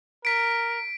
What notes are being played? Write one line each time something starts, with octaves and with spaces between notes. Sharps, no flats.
A#4 B6 D7